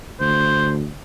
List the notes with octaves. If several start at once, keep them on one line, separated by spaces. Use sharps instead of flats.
D2 C5